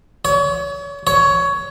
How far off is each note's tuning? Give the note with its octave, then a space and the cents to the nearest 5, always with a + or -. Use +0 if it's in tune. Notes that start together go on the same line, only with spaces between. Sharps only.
C#5 +35
C#5 +15